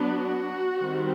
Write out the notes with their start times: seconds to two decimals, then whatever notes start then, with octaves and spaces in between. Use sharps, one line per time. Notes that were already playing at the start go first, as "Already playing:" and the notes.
Already playing: F#3 B3 D4
0.10 F#4
0.78 D#3 G3 C4